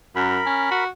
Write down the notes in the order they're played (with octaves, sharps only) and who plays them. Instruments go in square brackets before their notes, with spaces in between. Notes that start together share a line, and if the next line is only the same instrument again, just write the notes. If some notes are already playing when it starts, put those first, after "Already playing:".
[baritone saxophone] F#2 [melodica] A#4 B5
[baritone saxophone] C#4
F#4